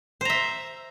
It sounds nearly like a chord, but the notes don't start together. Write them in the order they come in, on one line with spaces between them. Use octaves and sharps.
C5 A#5 E5